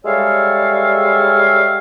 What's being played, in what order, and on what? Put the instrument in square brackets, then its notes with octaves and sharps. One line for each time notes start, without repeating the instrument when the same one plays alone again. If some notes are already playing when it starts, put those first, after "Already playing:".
[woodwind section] G3 G#3 A4 C#5 E5 F5